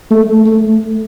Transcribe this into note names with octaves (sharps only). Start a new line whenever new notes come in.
A3
A3